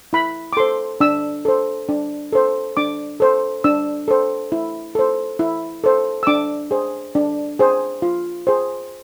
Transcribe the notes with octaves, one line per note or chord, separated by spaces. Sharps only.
E4 B5
D6
A4 C5 C6
D4 E6
A4 C5
D4
A4 C5
D4 D6
A4 C5
D4 E6
A4 C5
E4
A4 C5
E4
A4 C5
E6
D4 D6
G#4 C5
D4
G#4 C5
F4
G#4 C5